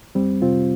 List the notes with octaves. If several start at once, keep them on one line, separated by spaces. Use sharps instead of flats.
F2 G3 C4
C3 C4 F4